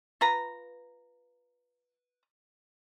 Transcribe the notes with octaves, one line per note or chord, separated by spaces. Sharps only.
F4 B4 A#5